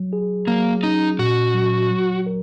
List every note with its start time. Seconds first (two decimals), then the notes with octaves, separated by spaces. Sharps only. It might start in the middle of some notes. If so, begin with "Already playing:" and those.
Already playing: F#3
0.13 G#4
0.47 F#3 A#3
0.83 C#4 D#4
1.19 A#2 F#4
1.54 F#3
1.91 F#3
2.26 A#4